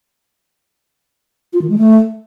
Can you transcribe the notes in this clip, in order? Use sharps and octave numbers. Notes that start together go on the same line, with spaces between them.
F4
D#3
G#3
A3